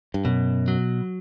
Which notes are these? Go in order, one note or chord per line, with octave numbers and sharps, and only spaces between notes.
G2
F#2 B2
F#3